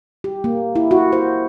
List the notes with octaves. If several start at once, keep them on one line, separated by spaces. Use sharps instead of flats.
G4
A#3
E4
F#4
C5